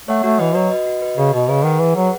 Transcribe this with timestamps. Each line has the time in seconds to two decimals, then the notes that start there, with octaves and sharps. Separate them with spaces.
0.08 A3 C#5 F#5
0.24 A3 F#4
0.39 E3 B4 D#5
0.55 F#3 F#4
0.71 B4 D#5
0.87 F#4
1.02 B4 D#5
1.17 C#3 F#4
1.33 B2 B4 D#5
1.49 C#3 G#4
1.64 D#3 B4 F#5
1.80 E3 G#4
1.96 F#3 B4 F#5